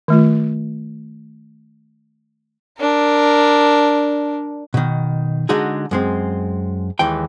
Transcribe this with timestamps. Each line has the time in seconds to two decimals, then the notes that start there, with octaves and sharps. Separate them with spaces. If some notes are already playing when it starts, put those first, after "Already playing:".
0.08 D#3 A3 F4
2.79 D4 A#4
4.74 B2 D#3
5.49 D3 G#3 D#4 F#4 G#4
5.91 F#2 G#3 C4
6.99 D#2 E3 G#3 G5